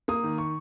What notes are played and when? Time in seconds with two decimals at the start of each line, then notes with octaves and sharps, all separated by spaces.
0.08 A#3 D#6
0.24 D#3
0.38 C#6